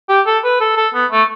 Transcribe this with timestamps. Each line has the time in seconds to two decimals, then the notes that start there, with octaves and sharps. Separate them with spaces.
0.09 G4
0.26 A4
0.44 B4
0.60 A4
0.76 A4
0.94 B3
1.11 A3